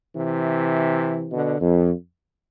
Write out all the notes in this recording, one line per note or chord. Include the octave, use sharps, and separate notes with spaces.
C3 E3
B2 D3
F2